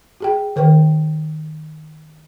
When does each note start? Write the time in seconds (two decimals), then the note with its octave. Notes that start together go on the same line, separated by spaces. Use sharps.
0.20 F#4 G#4 G5
0.56 D#3 A#4 B4 G5